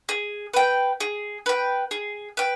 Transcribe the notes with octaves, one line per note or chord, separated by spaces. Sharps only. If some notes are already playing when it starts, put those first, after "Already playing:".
G#4
B4 G5
G#4
B4 G5
G#4
B4 G5